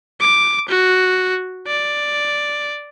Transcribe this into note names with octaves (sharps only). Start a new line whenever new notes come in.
D6
F#4
D5